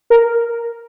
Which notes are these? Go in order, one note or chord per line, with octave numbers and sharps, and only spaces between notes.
A#4